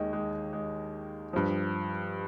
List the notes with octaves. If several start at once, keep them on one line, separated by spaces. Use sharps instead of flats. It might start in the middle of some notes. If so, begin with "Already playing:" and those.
Already playing: D#2 D#3 G#3
G#3
G#3
G2 F3